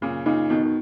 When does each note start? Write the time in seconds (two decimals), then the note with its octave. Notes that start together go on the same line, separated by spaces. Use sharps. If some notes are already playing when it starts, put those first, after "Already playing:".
0.01 F#2 A#2 C#3
0.26 A#2 C#3 D#4
0.50 B2 D#3 B3
0.63 D#3